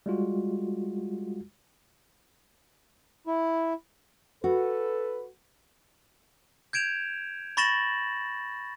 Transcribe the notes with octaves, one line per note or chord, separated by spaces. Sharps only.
G3 G#3 F4 F#4
E4
F#4 A4 B4
G6 G#6 D7 E7 F7
B5 C#6 A6 A#6 E7 F#7